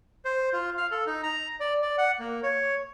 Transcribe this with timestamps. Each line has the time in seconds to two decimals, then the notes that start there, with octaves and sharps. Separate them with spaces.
0.25 C5
0.53 F4
0.77 F5
0.91 A4
1.07 D#4
1.23 A#5
1.60 D5
1.82 D5
1.98 F#5
2.19 A#3
2.43 C#5